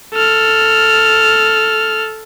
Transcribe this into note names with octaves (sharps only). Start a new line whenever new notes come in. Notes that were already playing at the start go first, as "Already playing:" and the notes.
A4 F6